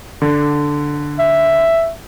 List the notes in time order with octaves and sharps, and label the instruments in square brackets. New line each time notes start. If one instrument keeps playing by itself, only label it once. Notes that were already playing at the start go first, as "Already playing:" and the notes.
[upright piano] D3
[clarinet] E5